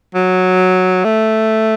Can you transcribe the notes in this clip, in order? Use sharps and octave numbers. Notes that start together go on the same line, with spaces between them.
F#3
A3